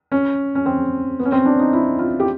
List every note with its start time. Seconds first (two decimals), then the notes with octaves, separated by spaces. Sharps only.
0.12 C#4
0.55 C#4
0.66 C4
1.20 B3
1.25 C#4
1.32 C4
1.46 D4
1.59 D#4
1.73 E4
1.99 F4
2.20 G4